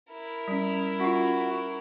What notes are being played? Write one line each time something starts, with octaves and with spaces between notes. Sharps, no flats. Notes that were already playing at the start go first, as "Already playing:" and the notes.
E4 A#4
G3 C#4
C#4 F4 F#4